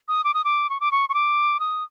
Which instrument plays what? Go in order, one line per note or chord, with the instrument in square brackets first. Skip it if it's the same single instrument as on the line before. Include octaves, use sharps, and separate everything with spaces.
[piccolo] D#6
D6
D#6
D6
C#6
D6
C#6
C#6
D6
D#6